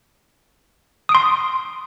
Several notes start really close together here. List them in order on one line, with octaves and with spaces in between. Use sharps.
D#6 D7 C6